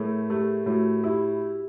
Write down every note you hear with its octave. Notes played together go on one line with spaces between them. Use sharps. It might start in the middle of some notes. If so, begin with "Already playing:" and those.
Already playing: A2 A3 G#4 A#4
A3 G4
A2 F#4
E4 G4